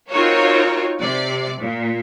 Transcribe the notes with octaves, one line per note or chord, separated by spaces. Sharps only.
C4 D#4 F4 F#4 A#4 C#5
C3 D5
A#2